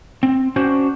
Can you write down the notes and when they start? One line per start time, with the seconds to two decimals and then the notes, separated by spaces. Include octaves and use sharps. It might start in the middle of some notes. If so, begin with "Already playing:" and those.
0.23 C4
0.56 C#4 D4 F#4 C5